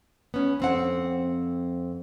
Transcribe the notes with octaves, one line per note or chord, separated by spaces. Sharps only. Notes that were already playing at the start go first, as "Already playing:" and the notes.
B3 C#4
F2 C4 F#5